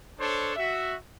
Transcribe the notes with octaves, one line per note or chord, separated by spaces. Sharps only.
D4 A4 C5 C#5
F#4 E5